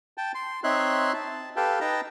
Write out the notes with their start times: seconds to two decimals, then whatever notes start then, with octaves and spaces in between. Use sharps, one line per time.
0.18 G5 A5
0.35 C6
0.64 C4 D#4 C#5 E5 C6 F#6
1.13 A5
1.56 G4 A4 B4 F5 G5 A5
1.80 D#4 B4 G5 A5 A#5